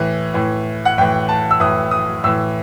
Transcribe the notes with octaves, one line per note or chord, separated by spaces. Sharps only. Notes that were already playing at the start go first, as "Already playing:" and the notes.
Already playing: A2 E3
A2 E3
F#5
A2 E3 G5
A5
E6
A2 E3 D#6
D#6
A2 E3 E6